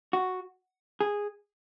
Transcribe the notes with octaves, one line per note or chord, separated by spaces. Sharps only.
F#4
G#4